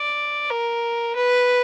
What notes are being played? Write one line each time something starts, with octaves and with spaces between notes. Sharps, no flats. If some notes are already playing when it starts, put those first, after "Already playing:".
Already playing: D5
A#4
B4